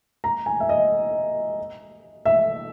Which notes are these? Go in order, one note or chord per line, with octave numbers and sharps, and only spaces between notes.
A#5
G#5
E5
D#5
E5